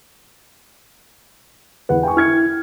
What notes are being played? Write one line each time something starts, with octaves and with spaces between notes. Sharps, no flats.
E2 B4 F#5
G5 G#5 C#6
E4 F6 G#6 C#7